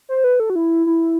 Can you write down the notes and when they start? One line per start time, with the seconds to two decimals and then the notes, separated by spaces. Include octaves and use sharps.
0.09 C5
0.24 B4
0.40 A4
0.50 F#4
0.55 E4
0.86 E4